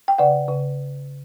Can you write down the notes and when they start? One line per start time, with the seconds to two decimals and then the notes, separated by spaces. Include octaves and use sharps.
0.08 G5
0.18 C#3 D5 F#5
0.48 C#3